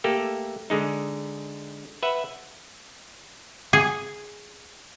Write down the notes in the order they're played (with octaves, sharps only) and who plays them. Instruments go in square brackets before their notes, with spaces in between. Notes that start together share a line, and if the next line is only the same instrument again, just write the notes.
[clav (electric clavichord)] A3 A#3 G4 A4
D3 G#3 D#4
B4 E5 F#5
[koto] G#4